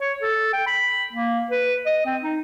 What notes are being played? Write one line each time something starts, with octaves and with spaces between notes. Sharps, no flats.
C#5
A4
G5
B5
A#3
B4
D#5
C4
D#4